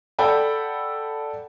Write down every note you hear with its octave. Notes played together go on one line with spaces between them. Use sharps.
A4 D5 F#5 G5 B5